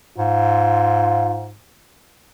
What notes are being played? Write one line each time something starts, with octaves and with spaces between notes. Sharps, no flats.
G#2 F4